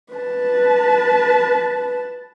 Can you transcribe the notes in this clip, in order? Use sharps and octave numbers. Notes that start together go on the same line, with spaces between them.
B4 A5